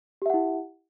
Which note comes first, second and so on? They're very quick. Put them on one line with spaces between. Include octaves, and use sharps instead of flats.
G4 E5 F#5 E4